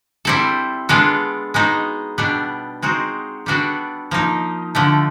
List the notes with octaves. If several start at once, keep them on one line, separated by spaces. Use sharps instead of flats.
G3 C4 E4 A4
G#3 B3 D4 F4 A4
G#3 B3 D#4 F#4
B2 G3 B3 D4
G#3 C4 D#4 F#4
G3 B3 D4 F#4 A4
F3 A#3 D#4
D3 F3 A3